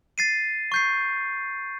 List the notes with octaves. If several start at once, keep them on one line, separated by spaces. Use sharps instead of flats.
A6 C7 D#7
C#6 G6 C7